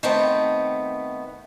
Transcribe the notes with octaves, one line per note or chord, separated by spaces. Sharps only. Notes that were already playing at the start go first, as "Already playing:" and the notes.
D#3 A3 B3 C4